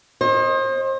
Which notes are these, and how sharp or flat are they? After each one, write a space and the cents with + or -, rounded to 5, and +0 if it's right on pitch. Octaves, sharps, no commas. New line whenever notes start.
C5 +35 D#5 +0